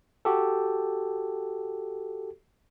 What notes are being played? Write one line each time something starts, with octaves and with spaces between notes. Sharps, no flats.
F#4 G4 A4